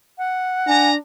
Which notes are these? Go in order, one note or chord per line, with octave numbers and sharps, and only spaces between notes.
F#5
D4 G#5 A#5